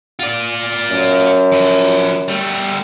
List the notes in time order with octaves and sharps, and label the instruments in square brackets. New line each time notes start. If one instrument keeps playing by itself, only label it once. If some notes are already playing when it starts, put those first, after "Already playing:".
[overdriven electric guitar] F4 D5
[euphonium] F#2
[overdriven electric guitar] F3 B4
G3 A3